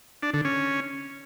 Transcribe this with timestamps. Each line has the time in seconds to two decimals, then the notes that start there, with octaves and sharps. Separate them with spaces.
0.23 D4
0.34 D3
0.45 C#4